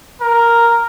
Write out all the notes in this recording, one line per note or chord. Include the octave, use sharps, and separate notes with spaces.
A#4